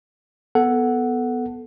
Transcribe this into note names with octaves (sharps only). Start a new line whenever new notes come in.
B3 A4 F#5